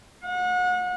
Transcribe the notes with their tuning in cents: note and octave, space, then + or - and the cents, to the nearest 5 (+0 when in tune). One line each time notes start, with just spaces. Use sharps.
F#5 -35